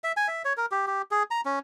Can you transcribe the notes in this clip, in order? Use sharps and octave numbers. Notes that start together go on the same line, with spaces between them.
E5
G#5
E5
C#5
A#4
G4
G4
G#4
A#5
C#4